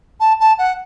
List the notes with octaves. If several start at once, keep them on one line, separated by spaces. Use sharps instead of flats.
A5
A5
F#5